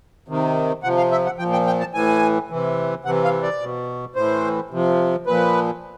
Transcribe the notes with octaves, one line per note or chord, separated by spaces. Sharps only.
C3 D#3
C3 F3 F#5
F5
E5
F#5
A#2 F3 G5
G5
G5
A5
A2 E3 G#5
C3 E3
C3 E3 F#5
F5
D5
B2
A2 E3 C5
C3 F3
A#2 F3 B4